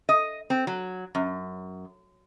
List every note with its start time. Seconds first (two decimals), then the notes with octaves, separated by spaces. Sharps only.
0.09 D#5
0.50 C4
0.67 F#3
1.15 F#2